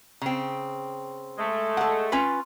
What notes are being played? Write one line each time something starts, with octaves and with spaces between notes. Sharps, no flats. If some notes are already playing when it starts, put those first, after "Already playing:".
C#3 C4
G#3 A3
A4 F#5
C#4 F4 B4